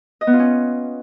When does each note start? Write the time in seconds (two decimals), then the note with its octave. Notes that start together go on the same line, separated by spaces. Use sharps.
0.21 D#5
0.27 B3
0.33 F4
0.39 C#4